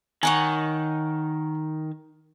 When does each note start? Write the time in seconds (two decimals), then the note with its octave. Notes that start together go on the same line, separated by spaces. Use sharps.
0.23 D#3 C#5 F#5 G#5